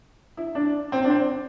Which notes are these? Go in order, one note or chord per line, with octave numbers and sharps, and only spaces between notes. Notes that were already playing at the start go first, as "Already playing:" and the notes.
E4
D4
C4
D4
C4